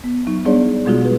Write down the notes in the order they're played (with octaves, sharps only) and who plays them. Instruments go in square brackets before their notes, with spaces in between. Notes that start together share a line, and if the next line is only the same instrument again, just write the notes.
[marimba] B3
F#3 D#4
G3 B3 D4 G#4 C#5 D5
B2 G3 G#3 F4 F#4 G#4
B4